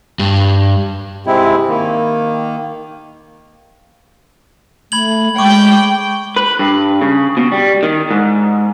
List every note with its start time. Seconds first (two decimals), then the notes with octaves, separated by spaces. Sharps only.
0.19 G2
1.26 G#2 C3 G#3 C4 E4
1.69 D#3 A#3
4.92 A3 B5 G#6 F#7
5.39 G#3 G5 C#6 D6
6.36 B4
6.59 G2
7.01 C#3
7.37 B2
7.52 G3
7.83 D#3
8.11 G#2